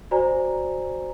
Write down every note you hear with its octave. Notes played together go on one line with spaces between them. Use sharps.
F#4 C5 D5 G#5 A#5